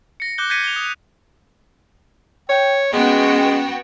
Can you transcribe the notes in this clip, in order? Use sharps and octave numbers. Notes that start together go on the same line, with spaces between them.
A#6 C#7
D6 F#6 G6 G7
G6 G#6 A#6 B6 C#7 D#7
F7 G7
D#6
C#5 G5
G#3 B3 C#4 F#4 G5